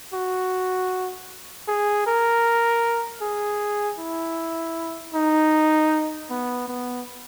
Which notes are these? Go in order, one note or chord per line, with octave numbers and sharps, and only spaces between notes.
F#4
G#4
A#4
G#4
E4
D#4
B3
B3